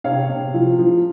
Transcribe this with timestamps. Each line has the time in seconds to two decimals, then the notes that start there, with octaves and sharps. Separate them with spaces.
0.04 C3 C#5 F5
0.29 C3
0.54 F3
0.79 F3